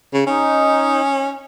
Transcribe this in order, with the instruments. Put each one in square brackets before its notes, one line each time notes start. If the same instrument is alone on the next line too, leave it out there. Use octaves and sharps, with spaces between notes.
[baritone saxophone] C#3
[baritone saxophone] C#4 [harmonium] D#4